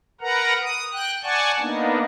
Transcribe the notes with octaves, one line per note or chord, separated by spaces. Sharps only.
A#4 B4 F#5 A#5
D#6
G5 F#6
D5 F#5 G#5 A5 C#6
A#3 B3 D4 D#4